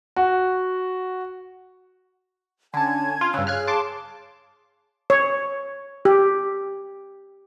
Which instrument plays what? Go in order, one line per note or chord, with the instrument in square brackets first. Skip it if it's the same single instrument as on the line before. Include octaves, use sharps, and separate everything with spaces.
[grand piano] F#4
[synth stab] D3 A5 [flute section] C#4 G#5 G#6
[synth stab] F4
[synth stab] G2 C#3 [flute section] E6 F#6
[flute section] G#4 C#5 F5 [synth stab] F6 F#6 G#6
[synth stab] A5 C6 D6
[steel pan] C#5
G4